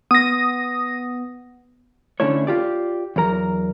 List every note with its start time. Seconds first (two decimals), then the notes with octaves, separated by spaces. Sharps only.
0.11 B3 D#6 A#6
2.20 D3 A3 C#4 D4 E4 C#5
2.47 F4 G4 D5
3.16 E2 F#3 A#4 A#5